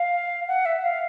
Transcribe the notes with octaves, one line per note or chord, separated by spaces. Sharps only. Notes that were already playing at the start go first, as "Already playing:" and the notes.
Already playing: F5
F#5
E5
F5